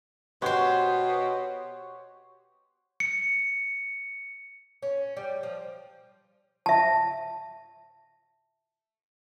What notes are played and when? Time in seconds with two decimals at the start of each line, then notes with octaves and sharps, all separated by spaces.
0.42 B2 G4 C5 C#5 F#5 C6
3.00 C#7
4.82 C#4
5.17 G3
5.43 F3
6.66 E5 A5